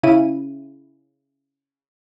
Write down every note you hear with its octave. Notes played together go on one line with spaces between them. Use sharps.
C#3 E4 D#7